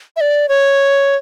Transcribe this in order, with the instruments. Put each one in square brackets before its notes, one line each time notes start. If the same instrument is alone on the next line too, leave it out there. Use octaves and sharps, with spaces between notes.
[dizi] E5
D5
C#5